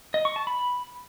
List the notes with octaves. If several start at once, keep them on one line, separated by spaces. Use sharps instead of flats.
D#5
C#6
A5
B5